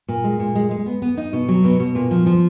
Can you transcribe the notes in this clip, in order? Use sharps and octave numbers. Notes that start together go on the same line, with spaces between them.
A#2
G#3
A#2
G#3
G#3
B3
B3
D#4
B2
F#3
B2
B2
A#2
F3
F3